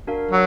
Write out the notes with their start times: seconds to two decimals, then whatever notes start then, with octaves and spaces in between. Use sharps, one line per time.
0.07 D4 F#4 A#4 F5
0.31 F#3